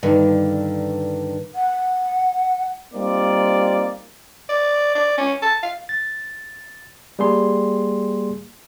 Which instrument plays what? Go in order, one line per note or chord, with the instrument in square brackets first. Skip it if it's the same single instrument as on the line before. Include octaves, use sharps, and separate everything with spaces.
[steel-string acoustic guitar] G2 D3 D#3
[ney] F#5
[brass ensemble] G3 A#3 C4 D#4 F4 D5
[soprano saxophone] D5
D5
C#4
A5
F5
[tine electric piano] A6
G3 A#3 G#4 C6